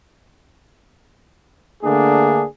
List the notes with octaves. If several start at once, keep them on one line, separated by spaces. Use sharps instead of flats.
D3 A3 A#3 D4 G#4